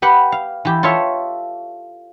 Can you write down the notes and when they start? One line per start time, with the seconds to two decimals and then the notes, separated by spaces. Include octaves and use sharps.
0.02 G4 B4 F#5
0.32 F5
0.65 E3 G4
0.83 F4 A4 C#5 E5